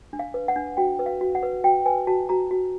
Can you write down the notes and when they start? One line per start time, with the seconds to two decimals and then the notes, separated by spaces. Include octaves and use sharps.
0.13 D4
0.19 F5
0.34 B4
0.48 F#5
0.56 D4
0.77 F#4 G5
0.99 B4
1.06 F5
1.21 F#4
1.35 F#5
1.43 B4
1.64 F#4 G5
1.86 B4 G#5
2.07 F#4 A5
2.29 F#4 A#5
2.51 F#4